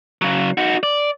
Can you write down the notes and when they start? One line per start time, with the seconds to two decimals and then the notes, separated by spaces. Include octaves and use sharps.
0.22 C#3 F#3
0.58 D#4 F#4
0.83 D5